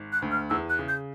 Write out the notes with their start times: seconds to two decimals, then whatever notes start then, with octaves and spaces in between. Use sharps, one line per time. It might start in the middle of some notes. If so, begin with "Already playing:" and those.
Already playing: G#1
0.12 F#6
0.22 D2
0.31 F6
0.50 E2 E6
0.70 F#6
0.79 C#3
0.88 G6